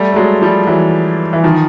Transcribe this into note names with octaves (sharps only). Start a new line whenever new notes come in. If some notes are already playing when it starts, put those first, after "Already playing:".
Already playing: G3 A3
A3
F#3 G#3
F3 G3
E3 F#3
E3
D#3 F3